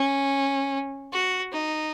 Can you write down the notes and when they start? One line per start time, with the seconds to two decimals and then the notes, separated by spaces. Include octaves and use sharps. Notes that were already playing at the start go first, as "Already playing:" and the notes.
Already playing: C#4
1.12 F#4
1.52 D#4